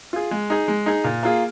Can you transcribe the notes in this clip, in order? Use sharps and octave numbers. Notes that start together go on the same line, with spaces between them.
F4 G#4
G#3
D#4 G#4
G#3
D#4 G#4
A#2
A#3 F4 G#4